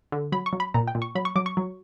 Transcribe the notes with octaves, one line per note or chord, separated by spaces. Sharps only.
D3
F#3 B5
C#6
F#3
B5
A#2 A#5
G5
A#2
C#6
F#3 B5
C#6
F#3 D6
C#6
F#3